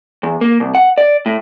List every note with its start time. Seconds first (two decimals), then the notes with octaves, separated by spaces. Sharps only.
0.23 E2
0.41 A#3
0.60 C2
0.75 F#5
0.98 D5
1.26 A2